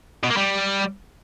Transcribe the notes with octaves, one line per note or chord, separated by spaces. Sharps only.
B2
A#3
G3